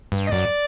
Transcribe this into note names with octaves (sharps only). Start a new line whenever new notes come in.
G2
D#5
F#2 D5